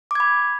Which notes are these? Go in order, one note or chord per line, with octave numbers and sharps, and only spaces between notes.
B5 D6 G#6